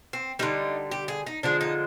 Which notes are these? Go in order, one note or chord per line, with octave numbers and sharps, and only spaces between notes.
C4
D3 G3 D#4
G4
G#4
D#4
D3 F3 G#3 D4
D#4